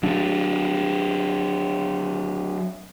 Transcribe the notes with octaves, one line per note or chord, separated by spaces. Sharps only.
F#3 D4